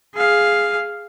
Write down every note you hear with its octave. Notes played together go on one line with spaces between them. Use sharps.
G#4 F5